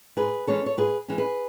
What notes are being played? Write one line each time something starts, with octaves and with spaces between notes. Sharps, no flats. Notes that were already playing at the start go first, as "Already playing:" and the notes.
G#2 G#4 B4
E3 G#3 C#4 A4 C#5
C#5
G#2 G#4 B4
E3 G#3 C#4
G#4 B4